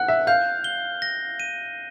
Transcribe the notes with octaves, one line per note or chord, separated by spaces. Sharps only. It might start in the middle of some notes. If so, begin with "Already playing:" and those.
Already playing: F#5 F#6
E5
F5 G6
G7
A#6
D#7